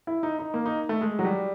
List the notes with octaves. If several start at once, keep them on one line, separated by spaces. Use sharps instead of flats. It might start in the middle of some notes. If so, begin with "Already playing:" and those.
E4
D#4
D#4
A#3
D#4
A3
G#3
F#3
G3